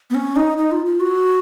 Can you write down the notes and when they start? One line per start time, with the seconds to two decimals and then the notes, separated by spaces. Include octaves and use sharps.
0.10 B3
0.15 C#4
0.36 D#4
0.58 D#4
0.72 F4
0.86 F4
1.00 F#4